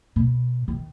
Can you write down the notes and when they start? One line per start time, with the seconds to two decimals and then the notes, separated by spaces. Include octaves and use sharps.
0.16 B2
0.68 D#3